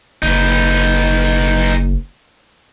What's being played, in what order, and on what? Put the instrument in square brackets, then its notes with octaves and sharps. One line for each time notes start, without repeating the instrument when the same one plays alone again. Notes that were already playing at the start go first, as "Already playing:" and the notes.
[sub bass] F#1 [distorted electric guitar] D#4 B4